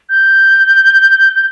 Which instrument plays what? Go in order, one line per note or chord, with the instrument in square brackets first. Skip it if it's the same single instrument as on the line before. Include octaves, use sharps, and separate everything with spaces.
[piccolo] G6